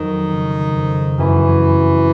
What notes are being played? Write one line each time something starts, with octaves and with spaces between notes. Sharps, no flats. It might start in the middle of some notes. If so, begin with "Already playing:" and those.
Already playing: F2 D#3 F#3
C#3
F2
F#2 E3